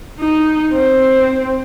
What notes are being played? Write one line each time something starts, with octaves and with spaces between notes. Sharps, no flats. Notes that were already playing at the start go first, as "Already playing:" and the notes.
D#4
C4